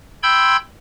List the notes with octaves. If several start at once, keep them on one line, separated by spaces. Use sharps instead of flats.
G5 B5 C6 E6 G6 G#6